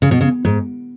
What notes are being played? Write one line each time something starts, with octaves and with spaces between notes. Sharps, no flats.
C#3
B2
C#3
G#2